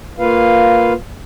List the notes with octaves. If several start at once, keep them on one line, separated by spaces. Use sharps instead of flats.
A#3 F4 B4 F5